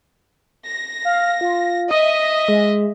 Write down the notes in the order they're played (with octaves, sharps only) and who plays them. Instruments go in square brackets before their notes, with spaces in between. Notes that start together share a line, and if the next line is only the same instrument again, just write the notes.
[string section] A#6
[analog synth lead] F5
F4
[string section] D#5 E5 [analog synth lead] D#6
[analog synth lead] G#3